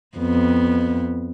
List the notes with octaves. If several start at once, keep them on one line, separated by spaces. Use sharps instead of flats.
F2 B3